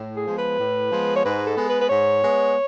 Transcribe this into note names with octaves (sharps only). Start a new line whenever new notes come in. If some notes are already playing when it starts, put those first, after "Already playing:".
Already playing: A2
G#4
F3 G#3 B3
B4
A2
F3 G#3 B3
C#5
G#2 B4
A4
G#3 B3
B4
B4
G#2 C#5
G#3 B3